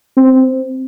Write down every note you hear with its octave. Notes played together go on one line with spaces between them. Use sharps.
C4